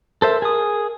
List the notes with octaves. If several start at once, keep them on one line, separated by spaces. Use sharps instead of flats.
A4 A#4 C5 E5
G#4 D#6